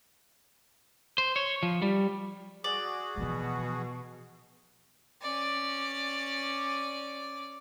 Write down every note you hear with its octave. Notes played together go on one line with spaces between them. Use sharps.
C5
C#5
F3
G3
F#4 G#4 D5
B2 E3 F3
C#4 D5